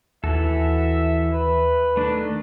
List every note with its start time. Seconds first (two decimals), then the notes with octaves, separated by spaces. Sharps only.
0.24 D#2 E3 F#4 A4 E5
1.33 B4
1.97 D#3 A3 D4